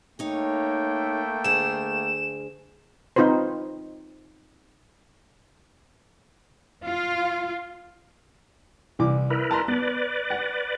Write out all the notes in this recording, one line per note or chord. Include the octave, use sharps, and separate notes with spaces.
A3 A#3 D#4 C#5 G5
D2 G#4 E7
C4 D#4 F4 B4 C5
F4
C2 E3 D6
E4 A#4 B4
A5 A#5 C6
B3 B4 D5
F#5